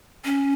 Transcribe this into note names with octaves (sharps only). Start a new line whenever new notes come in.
C#4